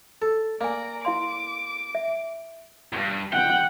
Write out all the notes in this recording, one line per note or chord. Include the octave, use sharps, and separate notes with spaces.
A4
A#3 D5 F5 G#5 A#5
E4 F5 C6 D6
E5
E2 G2
F#5 G5